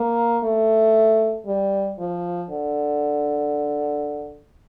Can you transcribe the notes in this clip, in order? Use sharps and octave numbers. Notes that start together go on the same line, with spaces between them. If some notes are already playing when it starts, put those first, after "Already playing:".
Already playing: A#3
A3
G3
F3
D3